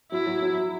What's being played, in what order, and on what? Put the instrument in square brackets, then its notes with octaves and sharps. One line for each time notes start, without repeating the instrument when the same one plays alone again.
[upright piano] F#3 [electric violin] E4
[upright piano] F#3
F#3